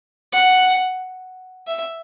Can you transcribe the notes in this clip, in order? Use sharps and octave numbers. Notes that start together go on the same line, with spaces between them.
F#5
E5